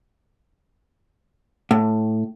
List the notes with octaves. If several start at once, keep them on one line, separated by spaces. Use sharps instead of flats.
A2